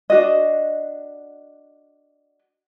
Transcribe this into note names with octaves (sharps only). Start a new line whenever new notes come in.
D4 F#4 D#5